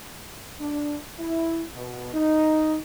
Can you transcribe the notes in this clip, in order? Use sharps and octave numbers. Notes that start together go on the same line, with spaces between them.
D4
E4
B2
D#4